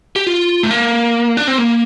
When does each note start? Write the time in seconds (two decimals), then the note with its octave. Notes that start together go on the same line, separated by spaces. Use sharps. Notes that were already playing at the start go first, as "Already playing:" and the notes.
0.16 G4
0.26 F4
0.63 A3
0.71 A#3
1.37 D4
1.47 C4
1.58 A#3